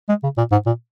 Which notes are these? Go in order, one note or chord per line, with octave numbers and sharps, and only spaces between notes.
G#3
C#3
A#2
G#2
A#2